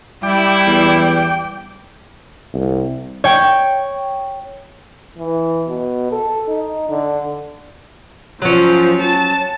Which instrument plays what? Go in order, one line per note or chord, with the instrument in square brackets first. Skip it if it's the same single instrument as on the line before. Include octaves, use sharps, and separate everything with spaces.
[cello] G3 [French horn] E4 [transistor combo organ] G5 D6
[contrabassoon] E2
[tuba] C2
[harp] C#5 G5
[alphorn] E3
B2
A4
D#4
D3
[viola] F3 [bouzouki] F#3 C#4
[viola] A5